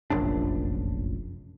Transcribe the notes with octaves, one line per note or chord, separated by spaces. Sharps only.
F1 A#1 F#2 D4